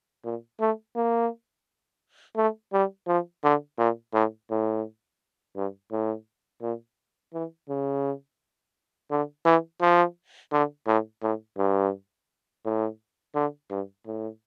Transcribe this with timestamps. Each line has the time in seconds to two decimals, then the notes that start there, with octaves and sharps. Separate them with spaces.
0.24 A#2
0.60 A3
0.96 A#3
2.36 A3
2.73 G3
3.07 F3
3.44 D3
3.78 A#2
4.13 A2
4.50 A2
5.56 G2
5.92 A2
6.62 A#2
7.33 E3
7.69 C#3
9.11 D3
9.45 E3
9.81 F3
10.52 D3
10.87 A2
11.22 A2
11.58 G2
12.65 A2
13.35 D3
13.70 G2
14.06 A2